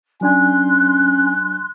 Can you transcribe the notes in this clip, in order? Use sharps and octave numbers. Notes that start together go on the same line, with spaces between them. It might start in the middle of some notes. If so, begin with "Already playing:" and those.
F#3 C#4 D4 G#5 C6 F#6